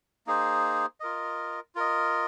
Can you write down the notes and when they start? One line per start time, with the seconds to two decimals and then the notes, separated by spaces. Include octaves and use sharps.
0.27 A#3 D#4 G#4 C5
1.00 F4 A#4 D#5
1.75 F4 A#4 D#5